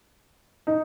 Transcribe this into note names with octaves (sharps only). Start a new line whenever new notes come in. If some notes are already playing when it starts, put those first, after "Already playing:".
D#4